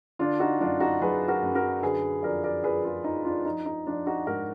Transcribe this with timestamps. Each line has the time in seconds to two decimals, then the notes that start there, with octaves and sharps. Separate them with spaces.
0.19 D3 D4 F4
0.40 D#4 F#4
0.60 F#2 D4 F4
0.80 D#4 F#4
1.01 F#3 G#4 B4
1.28 F#4 A#4
1.42 F#2
1.55 F#4 A#4
1.82 D3 G#4 B4
2.23 F2 A#4 D5
2.44 A#4 D5
2.64 F3 G#4 B4
2.84 F4 G#4
3.04 F2 D#4
3.25 D4 F4
3.45 F3 D#4
3.66 D#4
3.87 F3 D4 F4
4.06 D#4 F#4
4.27 G#2 F#4 A#4